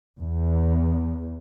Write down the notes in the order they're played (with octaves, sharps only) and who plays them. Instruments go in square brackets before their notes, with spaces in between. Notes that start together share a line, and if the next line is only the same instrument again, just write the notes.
[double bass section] E2